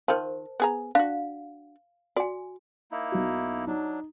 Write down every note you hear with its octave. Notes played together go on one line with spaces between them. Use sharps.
D#3 F4 A#4 C5 A5
B3 G#4 A#5
D4 F#4 F5
F#4 D5 G#5
A#3 D#4 E4
B1 F#4
F#3 D4 D#4